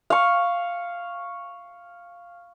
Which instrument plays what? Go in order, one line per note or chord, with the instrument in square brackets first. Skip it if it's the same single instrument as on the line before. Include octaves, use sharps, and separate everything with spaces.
[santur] F5 C#6